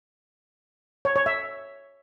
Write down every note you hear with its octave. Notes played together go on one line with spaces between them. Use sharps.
C#5
C#5
E5